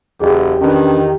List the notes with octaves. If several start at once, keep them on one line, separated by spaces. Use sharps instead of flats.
F#1 E2 G4 G#4 D#5
D#3 C#4 D4 B4